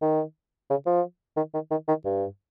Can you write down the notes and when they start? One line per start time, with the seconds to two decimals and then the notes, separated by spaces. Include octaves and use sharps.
0.02 D#3
0.70 C#3
0.86 F3
1.37 D#3
1.54 D#3
1.71 D#3
1.88 D#3
2.05 G2